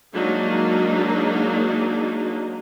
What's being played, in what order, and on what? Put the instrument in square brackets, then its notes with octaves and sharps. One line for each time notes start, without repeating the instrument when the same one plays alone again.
[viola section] F#3 G#3 A#3 D4 D#4